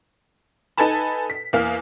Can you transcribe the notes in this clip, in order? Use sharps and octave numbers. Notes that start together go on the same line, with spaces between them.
D#4 A4 B4 G#5 A5 B5
B6
E2 A#3 F6